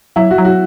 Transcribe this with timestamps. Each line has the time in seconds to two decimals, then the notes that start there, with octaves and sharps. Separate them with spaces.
0.16 F#3 E4
0.31 F#4
0.38 F#3
0.45 F#4